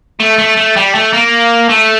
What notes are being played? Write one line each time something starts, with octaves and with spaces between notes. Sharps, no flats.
A3
A3
A3
G3
A3
A#3
A3